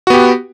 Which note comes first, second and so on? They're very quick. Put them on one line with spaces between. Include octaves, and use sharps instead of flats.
F#4 B3 G4